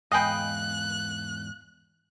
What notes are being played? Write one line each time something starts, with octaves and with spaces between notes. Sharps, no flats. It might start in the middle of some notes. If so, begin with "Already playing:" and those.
E2 G#2 D#5 F5 G5 G#5 B5 F#6